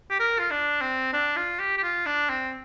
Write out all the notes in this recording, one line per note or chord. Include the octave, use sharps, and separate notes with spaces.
G4
A#4
F4
D4
C4
D4
F4
G4
G4
F4
D4
C4